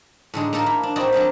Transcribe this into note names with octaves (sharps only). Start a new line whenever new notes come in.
A2 D3 G#3 D#4
A#3 D#4 A4 A#4
E4
D4
C4 D#4 E4 F#4 D5 D#5
F#3 D4 D#5 F5